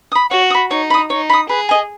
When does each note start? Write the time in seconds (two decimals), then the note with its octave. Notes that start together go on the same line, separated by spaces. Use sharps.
0.12 B5 D#6
0.31 F#4 C#5
0.50 D#6
0.54 B5
0.71 D#4 C#5
0.90 B5 D#6
1.10 D#4 C#5
1.30 B5 D#6
1.49 G#4 B4
1.69 D#5 G#5